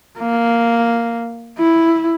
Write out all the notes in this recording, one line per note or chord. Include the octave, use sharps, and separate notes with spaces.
A#3
E4